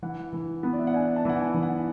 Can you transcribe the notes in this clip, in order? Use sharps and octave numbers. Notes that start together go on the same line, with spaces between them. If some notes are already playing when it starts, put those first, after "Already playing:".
E3 F#5
E3
B3
D5
E5
F#5
D4 G#5
A5
E3 F#5
G#5
E3
F#5